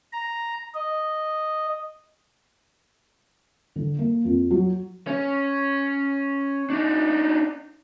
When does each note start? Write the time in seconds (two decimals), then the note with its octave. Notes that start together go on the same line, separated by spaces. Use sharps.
0.13 A#5
0.74 D#5
3.76 D3
3.99 A#3
4.25 F2
4.51 F#3
5.07 C#4
6.70 D4 D#4